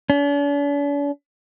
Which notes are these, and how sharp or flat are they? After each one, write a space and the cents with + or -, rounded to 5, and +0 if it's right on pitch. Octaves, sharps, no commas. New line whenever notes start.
D4 -45